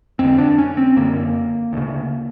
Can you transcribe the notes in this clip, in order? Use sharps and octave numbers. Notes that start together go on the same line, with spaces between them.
F2 D3 C4
D4
C#4
C4
F#2 D3 A#3
D2 C#3